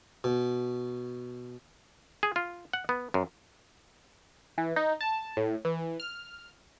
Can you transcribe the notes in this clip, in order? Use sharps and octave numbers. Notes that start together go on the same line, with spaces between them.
B2
G#4
F4
F#5
B3
F#2
E3
D#4
A5
A2
E3
F6